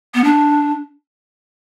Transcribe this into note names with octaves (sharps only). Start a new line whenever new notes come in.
B3
D4